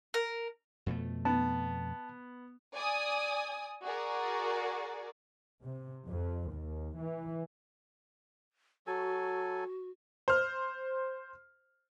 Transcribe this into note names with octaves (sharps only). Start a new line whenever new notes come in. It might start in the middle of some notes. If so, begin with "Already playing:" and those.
A#4
F2 B2 A3
B3 A5
D5 G#5 D#6
F#4 G#4 A#4 D5
C3
F2
D#2
E3
F#3 F#4 A4 G#5
C5 F6